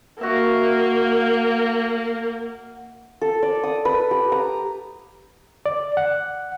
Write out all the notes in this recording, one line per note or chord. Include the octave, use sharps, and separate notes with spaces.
A#3 F#4 E5
A4
D5
D#6
B4
G4
A#5
D5
F#5